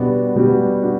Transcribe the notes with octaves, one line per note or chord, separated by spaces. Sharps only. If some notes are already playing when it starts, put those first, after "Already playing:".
Already playing: B2 G3 B3 D4 F#4
B2 G3 B3 D4 F#4
D4 F#4